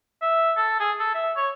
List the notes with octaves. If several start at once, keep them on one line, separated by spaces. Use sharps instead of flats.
E5
A4
G#4
A4
E5
C#5